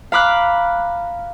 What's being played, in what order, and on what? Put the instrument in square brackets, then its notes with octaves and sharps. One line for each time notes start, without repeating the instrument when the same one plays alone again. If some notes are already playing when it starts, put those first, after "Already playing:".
[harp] F5 A#5 B5 D6 F6 F#6